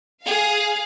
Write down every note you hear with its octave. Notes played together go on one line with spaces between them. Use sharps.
G#4 F5